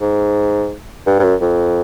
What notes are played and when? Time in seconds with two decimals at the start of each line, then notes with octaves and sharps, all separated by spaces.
0.01 G#2
1.07 G2
1.19 G2
1.23 F#2
1.41 F2